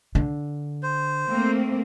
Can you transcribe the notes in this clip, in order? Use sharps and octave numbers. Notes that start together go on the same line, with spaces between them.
D3
C5
A3 A#3 C4